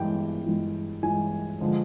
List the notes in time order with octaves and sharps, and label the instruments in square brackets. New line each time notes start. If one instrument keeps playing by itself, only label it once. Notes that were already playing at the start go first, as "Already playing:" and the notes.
Already playing: [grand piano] G2 E3 G#3 G5
G2 E3 G#3
G2 E3 G#3 G#5
D3 F3 G#3